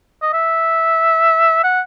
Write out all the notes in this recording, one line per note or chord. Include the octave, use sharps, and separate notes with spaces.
D#5
E5
F#5